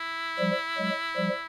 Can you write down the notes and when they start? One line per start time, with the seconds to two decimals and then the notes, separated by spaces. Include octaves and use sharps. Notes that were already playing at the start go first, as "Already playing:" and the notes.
Already playing: E4
0.39 F3 G3
0.78 F#3 G#3
1.17 F3 G3